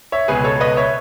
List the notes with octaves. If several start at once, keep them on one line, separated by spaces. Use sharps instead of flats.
C#5 E5
C#2 B2 G#3 G#4 B4
A4 C#5
B4 D#5
C#5 E5